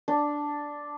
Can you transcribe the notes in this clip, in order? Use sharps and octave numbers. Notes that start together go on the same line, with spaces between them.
D4